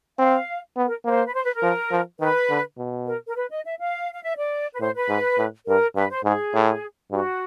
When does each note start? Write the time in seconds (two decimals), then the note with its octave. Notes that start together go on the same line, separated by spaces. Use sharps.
0.19 C4 F5
0.77 B3
0.87 A#4
1.05 A#3 C5
1.26 B4
1.35 C5
1.44 B4
1.54 A#4
1.63 F3
1.91 F3
2.21 D#3 B4
2.50 D3
2.78 B2
3.07 A#4
3.27 A#4
3.36 B4
3.50 D#5
3.65 E5
3.79 F5
4.14 F5
4.23 E5
4.37 D5
4.74 B4
4.80 A2 C5
4.95 B4
5.09 G#2
5.38 A2
5.67 G2 A#4
5.96 G2 B4
6.10 C5
6.24 G#2 G#4
6.54 A2
7.11 G2 F#4